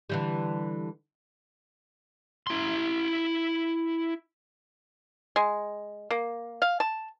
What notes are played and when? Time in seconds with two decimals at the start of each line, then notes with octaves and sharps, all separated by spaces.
0.10 D3 E3 G3
2.47 E4 C6
5.36 G#3
6.11 A#3
6.62 F5
6.80 A5